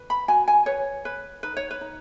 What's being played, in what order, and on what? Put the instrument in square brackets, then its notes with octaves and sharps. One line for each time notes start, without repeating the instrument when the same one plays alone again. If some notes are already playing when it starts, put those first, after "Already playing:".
Already playing: [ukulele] B4
B5
F#4 G#5
G#5
B4 C#5
B4
D#4 B4
C#5
B4
D#4